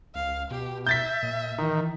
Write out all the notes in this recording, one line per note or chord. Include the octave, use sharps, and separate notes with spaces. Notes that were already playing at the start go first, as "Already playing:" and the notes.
C#2 F5
B2 G4
E5 G6 A6 B6
A#2
D#3 E3